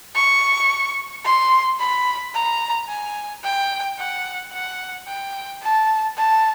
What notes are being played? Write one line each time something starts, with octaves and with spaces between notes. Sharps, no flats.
C#6
C6
B5
A#5
G#5
G5
F#5
F#5
G5
A5
A5